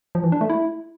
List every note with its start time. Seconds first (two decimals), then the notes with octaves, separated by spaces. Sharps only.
0.15 F3
0.24 E3
0.32 D4
0.41 A3
0.50 E4